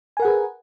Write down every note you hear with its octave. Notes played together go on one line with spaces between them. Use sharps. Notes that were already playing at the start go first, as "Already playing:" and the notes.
G#4 A#4 B4 F#5 G#5